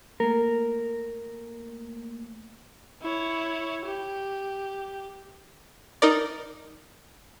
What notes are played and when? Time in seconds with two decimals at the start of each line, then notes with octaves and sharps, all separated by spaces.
0.20 A3 A#3 A#4
3.02 E4 C#5
3.86 G4
6.02 D#4 A#4 D5